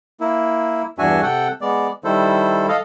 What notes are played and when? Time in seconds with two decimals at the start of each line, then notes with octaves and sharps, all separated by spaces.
0.21 A#3 E4
0.99 E2 G2 D4 F#4 E5 G#5
1.23 C3 A4 F#5 G5
1.61 G#3 B3 D5
2.04 D#3 G3 E4 A4 C5
2.68 A4 D#5 F5